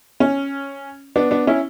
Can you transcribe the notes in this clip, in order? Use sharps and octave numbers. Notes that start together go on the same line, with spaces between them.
C#4
B3 D4
B3 D4
C#4 E4